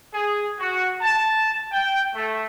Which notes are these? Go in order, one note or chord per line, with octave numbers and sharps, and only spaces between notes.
G#4
F#4
A5
G5
A3